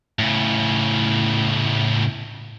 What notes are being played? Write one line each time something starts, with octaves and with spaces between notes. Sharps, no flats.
A2 C#3